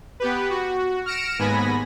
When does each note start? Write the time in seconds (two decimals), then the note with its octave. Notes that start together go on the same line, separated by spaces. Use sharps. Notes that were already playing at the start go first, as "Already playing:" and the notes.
0.20 B3 G4 B4
0.50 F#4
1.06 F6 A#6 C#7 D7 E7
1.39 D#2 G#2 B3 G#5 B5 A#6